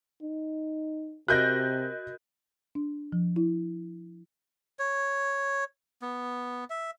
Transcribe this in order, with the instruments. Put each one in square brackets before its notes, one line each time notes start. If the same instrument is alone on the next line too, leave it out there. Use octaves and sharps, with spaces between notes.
[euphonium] D#4
[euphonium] C3 [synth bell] F#4 A#4 D#5 [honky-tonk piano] F#6 G6 A#6
[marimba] D4
F3
E4
[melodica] C#5
B3
E5